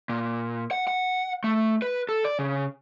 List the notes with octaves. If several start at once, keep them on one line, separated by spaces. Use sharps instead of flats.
A#2
F#5
F#5
A3
B4
A4
D5
C#3